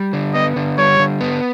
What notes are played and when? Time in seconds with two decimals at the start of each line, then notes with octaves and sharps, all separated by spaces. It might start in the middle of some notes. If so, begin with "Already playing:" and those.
Already playing: G3
0.13 D3
0.34 B3 D#5
0.56 D3
0.78 G3 C#5
0.99 D3
1.21 B3